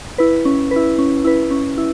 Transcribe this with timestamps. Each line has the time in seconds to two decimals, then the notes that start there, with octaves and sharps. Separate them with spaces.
0.18 E4 B4
0.45 C#4
0.71 B4
0.76 E4
0.98 C#4
1.24 E4 B4
1.51 C#4
1.78 E4